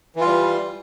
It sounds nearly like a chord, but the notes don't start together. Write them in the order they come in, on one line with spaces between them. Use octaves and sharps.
E3 F4 G3